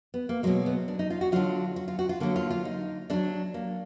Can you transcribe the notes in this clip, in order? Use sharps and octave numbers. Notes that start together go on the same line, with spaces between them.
B3
A#3
B2 F#3 G#3
B3
D4
D#4
F4
F#4
D3 F#3 F4
F#4
F4
F#4
F4
D3 F#3 A#3
F4
F4
D#4
D3 F#3 D4
A#3